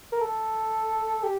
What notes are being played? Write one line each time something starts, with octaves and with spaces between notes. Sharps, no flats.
A#4
A4
G4